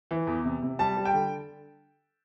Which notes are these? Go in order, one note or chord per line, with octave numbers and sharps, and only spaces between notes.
E3
E2
C3
C3
G3 A5
G3
G5
D3